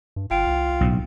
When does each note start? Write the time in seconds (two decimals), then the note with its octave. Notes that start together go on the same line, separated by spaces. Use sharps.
0.16 G2
0.31 G1 F4 G5 D7
0.47 C2
0.81 B1 A2